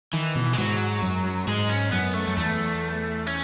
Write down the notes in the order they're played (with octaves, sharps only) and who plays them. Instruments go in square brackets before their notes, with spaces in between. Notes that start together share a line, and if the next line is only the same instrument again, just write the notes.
[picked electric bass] D#3 [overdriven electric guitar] E3
[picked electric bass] B2
[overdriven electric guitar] G#3
[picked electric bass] G#2 [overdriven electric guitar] F#3
[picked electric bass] F#2
[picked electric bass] G#2 [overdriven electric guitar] G#3
[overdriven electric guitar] C#4
[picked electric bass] F#2 [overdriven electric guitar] B3
[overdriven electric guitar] A3
[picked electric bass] F#2
[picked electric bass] E2 [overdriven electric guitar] A3
[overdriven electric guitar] C#4